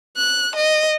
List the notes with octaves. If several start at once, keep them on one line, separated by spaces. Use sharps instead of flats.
F#6
D#5